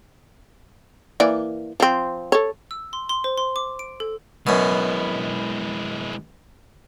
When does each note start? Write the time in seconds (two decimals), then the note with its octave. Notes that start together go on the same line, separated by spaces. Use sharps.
1.20 E3 A#3 D5
1.80 F3 C4
2.32 A4 C#5
2.71 E6
2.93 C6
3.09 C6
3.24 C5
3.38 C6
3.56 D6
3.79 D7
4.00 A4
4.47 F#2 B2 G#3 E4